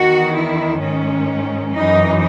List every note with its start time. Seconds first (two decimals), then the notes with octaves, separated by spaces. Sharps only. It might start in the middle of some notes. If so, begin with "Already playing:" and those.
Already playing: E2 D#3 F#4
0.36 E4
0.82 G#2 D#3 C#4
1.74 F#2 E3 D#4